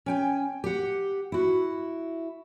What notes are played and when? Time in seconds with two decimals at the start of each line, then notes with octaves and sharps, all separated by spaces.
0.06 C#4 G5 G#5
0.64 G4 F#5
1.32 E4 F#4